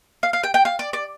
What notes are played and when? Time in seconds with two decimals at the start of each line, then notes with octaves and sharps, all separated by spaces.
0.23 F5
0.33 F5
0.43 G5
0.54 G5
0.65 F5
0.79 D5
0.93 D5